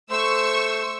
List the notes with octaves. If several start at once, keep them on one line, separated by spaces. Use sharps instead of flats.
A3 C5 C#6 E6